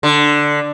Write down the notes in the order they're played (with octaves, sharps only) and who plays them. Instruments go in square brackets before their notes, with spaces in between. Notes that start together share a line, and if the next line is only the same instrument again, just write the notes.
[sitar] D3